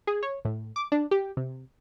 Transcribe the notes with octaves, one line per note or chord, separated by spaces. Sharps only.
G#4
C#5
A2
D6
D4
G4
C3